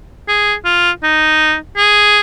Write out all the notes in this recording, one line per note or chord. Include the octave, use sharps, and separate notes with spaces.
G#4
F4
D#4
G#4